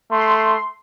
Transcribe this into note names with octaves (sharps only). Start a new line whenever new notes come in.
A3 C6